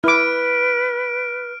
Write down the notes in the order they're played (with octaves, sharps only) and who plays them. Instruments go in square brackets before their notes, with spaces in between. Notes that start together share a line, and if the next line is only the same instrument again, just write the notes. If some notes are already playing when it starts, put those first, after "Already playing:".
[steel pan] E4 D6 [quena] B4 [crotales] F6 D7